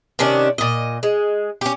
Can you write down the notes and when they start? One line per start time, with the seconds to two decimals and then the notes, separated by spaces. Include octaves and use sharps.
0.19 C3 D#3 C#4 D4
0.58 A#2 D#5
1.03 G#3
1.61 C#4 G4